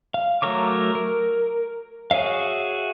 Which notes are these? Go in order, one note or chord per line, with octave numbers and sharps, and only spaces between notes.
F5
F#3 A3 A#4 C#5 D6
A#4
F#4 G#4 C#5 E5 F5